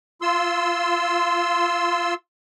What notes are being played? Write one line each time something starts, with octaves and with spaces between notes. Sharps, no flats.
F4 C6 E6